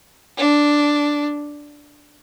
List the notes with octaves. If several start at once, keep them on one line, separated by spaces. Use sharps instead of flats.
D4